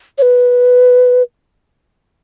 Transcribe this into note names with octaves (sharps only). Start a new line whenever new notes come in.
C#5
B4